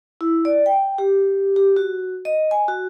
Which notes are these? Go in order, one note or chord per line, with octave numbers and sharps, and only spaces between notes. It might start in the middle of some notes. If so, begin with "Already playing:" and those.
E4
D5
G5
G4
G4
F#4
D#5
G#5
F#4